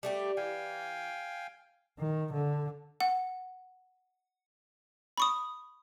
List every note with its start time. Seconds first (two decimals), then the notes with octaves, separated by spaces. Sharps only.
0.03 G3 A3 G4
0.37 E3 F5 G5 G#5
1.99 D#3
2.33 D3
3.00 F#5
5.18 B5 C#6 D#6